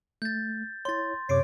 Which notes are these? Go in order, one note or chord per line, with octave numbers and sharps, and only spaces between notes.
A3 G6 A6
E4 C#5 C6 A6
F#2 C3 C#5 D6 C7 D7